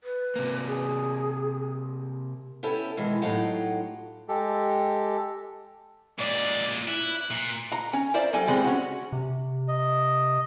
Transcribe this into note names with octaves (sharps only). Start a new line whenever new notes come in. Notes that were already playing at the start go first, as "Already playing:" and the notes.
B4
C3 A#3
G#4
B3 C#4 E4 G4 A4
B2 D#3 E3 G#3
A2 F#3 D#4 F4 G4 F#5
G#3 G4 A4
A#2 G#3 D5
E4 F#6
A#2
A#5
C#4
A#4 C5 D5 E5 F5 A#5
F#3 G3 A4 G#5
E3 G3 G#3 C4
C#4 F#4
C3
D#5